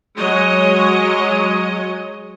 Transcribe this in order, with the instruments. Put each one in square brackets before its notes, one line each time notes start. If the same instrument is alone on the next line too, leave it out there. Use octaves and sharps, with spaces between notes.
[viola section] F#3 G#3 C#5 D#5